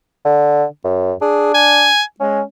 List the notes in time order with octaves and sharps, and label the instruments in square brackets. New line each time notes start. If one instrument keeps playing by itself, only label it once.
[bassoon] D3
F#2
[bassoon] D4 [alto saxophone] G#4
[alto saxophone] G#5
[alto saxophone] G#3 [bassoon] C#4